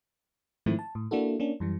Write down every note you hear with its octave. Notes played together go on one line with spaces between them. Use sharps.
G#2 D#3 F3 A3 C4 E4
A5
A2
A#3 D4 E4 F#4 A4
A#3 C#4 D4
F#2 E3 G3